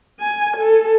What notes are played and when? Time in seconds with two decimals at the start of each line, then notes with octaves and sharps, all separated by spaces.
0.20 G#5
0.57 A4